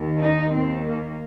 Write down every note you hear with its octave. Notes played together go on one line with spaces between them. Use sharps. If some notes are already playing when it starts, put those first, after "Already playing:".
Already playing: D#2 D#3
D#4
D#2 D#3 C4
A#3